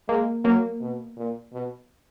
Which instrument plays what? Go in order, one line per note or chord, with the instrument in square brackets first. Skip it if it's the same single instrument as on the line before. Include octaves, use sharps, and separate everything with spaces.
[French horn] G#3 [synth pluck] A#3
[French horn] F#3 [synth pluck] A#3
[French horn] B2
A#2
B2